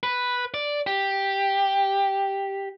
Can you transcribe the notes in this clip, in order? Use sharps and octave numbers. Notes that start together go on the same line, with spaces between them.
B4
D5
G4